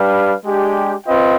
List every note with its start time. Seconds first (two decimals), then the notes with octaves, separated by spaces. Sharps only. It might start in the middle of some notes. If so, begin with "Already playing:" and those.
Already playing: G3 D4 G4 B4 F5
0.45 G#3 D4 G4
1.05 C4 F4 B4 D#5 G5